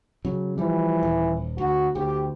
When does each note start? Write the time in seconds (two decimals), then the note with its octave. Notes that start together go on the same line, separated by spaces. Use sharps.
0.25 C#3 F#3
0.58 E3 F3 G3
1.03 D#1
1.58 D2 F#4
1.96 D2 G4